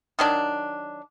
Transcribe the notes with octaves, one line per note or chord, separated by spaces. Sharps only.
D#3 F#3 D4